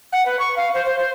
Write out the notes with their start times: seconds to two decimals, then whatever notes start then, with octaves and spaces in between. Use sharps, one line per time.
0.12 F#5
0.25 B4
0.39 C#6
0.56 F5
0.74 C5
0.86 C5
0.99 C5